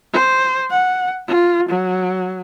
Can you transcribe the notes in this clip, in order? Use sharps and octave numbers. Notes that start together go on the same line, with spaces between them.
C5
F#5
F4
F#3